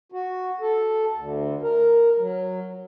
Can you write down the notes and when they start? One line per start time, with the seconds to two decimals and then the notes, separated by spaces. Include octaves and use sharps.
0.12 F#4
0.60 A4
1.13 D2
1.62 A#4
2.18 F#3